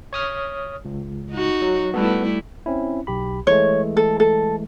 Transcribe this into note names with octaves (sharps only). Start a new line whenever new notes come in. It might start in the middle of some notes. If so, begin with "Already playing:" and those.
C#5 D#6 F6
C#2
D#4 F#4
F#3
G3 A3 B3 E4 A4 B4
C4 C#4 E4
B1 G4 B5
E3 G#3 A3 C#5
A4
A4